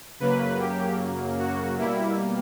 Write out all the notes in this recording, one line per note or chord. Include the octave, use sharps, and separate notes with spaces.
F#2 C#3 F#3 A#3 B4
G4
F#4
B2 G3 A#3 E4